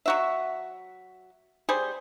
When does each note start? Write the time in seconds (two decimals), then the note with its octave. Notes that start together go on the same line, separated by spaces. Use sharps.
0.06 F#3 F#4 E5
1.69 G3 G#4 C5